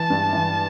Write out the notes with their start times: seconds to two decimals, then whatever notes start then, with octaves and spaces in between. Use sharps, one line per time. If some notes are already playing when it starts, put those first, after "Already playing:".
Already playing: E3 A5
0.10 G2
0.33 E3